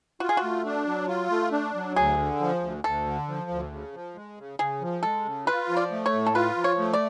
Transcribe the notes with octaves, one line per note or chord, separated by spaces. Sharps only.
F4 F#4
G#4
F#4
A3
D4
F#3
F4
A3
D4
F#3
D2 G#4
D3
F3
D2
D2 A4
D3
F3
D2
C#3
F3
G#3
C#3
C#3 G#4
F3
G#3 A4
C#3
F4 B4
F3
D5
A3
C#5
A2
A4
F4 B4
F3
C#5
A3
D5